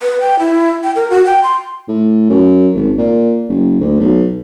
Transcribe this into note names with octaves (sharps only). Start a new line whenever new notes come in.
B4
G5
E4
G5
A#4
F#4
G5
C6
A2
F#2
G#1
A#2
F#1
D2
B1